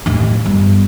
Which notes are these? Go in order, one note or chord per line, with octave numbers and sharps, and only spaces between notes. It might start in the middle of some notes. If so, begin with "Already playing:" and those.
D#2 A2
G1